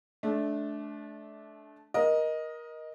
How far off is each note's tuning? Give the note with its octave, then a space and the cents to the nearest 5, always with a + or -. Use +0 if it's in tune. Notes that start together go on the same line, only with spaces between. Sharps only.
A3 -30 D4 -10
A#4 +20 D#5 +0